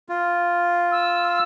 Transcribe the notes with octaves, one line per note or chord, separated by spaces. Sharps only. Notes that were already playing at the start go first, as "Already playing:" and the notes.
F4
E6